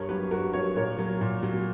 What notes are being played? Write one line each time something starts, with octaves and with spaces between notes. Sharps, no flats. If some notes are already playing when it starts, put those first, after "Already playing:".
Already playing: G2 A#4 C#5
F#3 G4 B4
G2 F#4 A#4
F#3 A#4 C#5
A#2 A#4 C#5
F#3
A#2
F#3